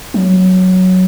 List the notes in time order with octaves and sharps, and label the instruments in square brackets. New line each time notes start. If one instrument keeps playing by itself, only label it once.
[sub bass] F#3